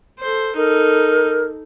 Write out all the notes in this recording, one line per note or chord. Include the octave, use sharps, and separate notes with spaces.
A4 C5
D#4 A4 A#4